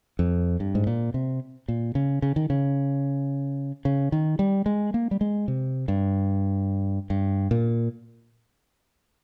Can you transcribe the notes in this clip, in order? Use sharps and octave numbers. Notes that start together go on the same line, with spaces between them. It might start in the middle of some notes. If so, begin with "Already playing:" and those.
F2
G2
G#2
A#2
C3
A#2
C#3
C#3
D#3
C#3
C#3
D#3
G3
G#3
A#3
G3
G#3
C3
G2
G2
A#2